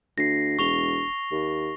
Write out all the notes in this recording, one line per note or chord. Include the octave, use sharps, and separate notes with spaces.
D2 A#6 C7
E1 C#6 F7 G7
D#2